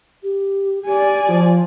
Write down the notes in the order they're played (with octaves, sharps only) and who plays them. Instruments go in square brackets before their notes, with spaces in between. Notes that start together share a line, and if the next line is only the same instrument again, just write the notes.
[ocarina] G4
[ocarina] G4 [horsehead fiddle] D5 G#5
[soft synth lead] F3 [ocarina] F4